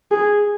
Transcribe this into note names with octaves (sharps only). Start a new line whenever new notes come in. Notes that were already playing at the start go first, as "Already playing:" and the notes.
G#4